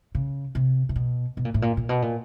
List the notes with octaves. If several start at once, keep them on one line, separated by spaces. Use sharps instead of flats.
C#3
C3
C3
B2
B2
A#2
A2
A#2
A#2
B2
A#2